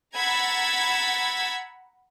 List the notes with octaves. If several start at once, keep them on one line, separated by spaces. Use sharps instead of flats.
F#5 A#5 B5 E6 G#6 A6